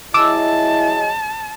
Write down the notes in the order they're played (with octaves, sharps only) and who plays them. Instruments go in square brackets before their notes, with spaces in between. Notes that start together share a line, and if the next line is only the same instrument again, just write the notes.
[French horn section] F#3 G#4 D#5 [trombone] E4 [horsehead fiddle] A5 [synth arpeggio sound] D6 E6